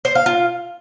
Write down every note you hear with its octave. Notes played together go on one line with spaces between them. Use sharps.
C5
F5
F4